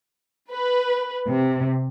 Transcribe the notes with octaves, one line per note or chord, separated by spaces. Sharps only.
B4
C3